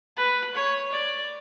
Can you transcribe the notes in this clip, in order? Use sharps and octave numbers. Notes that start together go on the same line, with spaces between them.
B4
C#5
D5